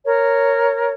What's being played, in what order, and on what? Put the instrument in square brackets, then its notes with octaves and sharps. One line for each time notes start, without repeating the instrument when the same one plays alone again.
[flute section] A#4 C#5